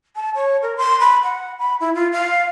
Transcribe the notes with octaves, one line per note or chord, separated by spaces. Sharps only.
A5
C#5
A#4
C6
B5
F#5
B5
E4
F4
F5